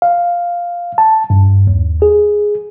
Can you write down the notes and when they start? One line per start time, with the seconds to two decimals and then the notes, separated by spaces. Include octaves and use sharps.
0.02 F5
0.98 A5
1.30 G2
1.67 D#2
2.02 G#4